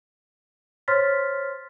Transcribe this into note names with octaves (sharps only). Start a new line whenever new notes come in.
C5 C#5 C6 F6 A6 B6